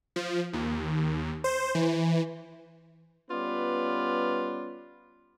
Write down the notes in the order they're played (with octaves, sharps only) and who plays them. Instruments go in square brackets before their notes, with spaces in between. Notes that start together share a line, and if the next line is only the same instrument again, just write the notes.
[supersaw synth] F3
D#2
C5
E3
[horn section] G3 B3 C#4 F4 B4 D5